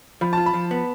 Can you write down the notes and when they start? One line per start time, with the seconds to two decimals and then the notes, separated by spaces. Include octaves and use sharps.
0.21 F3 B5
0.33 F4 A5
0.46 B5
0.54 F3
0.71 B3